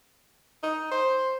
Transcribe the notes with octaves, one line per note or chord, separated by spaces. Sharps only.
D#4
C5